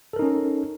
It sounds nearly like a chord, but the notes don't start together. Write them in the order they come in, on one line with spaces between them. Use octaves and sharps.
A4 A#4 D#4 C#4